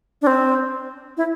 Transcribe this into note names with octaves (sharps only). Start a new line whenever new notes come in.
D4
C4
E4